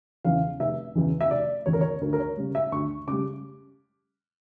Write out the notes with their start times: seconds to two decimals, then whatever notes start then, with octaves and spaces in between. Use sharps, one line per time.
0.25 E2 C#3 E3 F5
0.60 F1 E5
0.95 E2 C#3 E3
1.21 E5
1.30 F1 D5
1.66 E2 C#3 E3 C#5
1.73 A#4
1.81 C#5
2.01 D2 A#4
2.13 A#4
2.20 C#5
2.37 C#3 G3
2.55 E5
2.72 D2 C#6
3.07 C#3 G3 D6